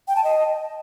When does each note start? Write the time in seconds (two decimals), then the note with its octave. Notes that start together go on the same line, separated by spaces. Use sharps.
0.08 G5
0.16 A5
0.24 D#5